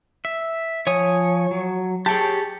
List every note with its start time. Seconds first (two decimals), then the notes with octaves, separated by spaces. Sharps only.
0.25 E5
0.87 F3 C#5 G#5 D#6
1.51 F#3
2.06 G4 G#4 C#5 G5 A5